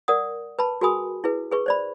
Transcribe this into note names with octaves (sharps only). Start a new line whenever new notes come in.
A#4 D5 F#5 D#6
B4 A5 B5
F#4 G#4 A#4 G#5 B5 D#6
E4 G#4 B4
G#4 B4 C#6
C5 D5 B5